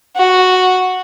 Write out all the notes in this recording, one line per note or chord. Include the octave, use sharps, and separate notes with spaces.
F#4